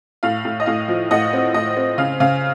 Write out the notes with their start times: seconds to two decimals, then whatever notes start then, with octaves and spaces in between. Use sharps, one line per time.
0.23 A2 F5
0.45 A2
0.60 D#5
0.66 A2 F5
0.88 F3
1.11 A2 D#5 F#5
1.33 C4
1.54 A2 D#5
1.77 C4
1.98 C#3 F5
2.20 C#3 F5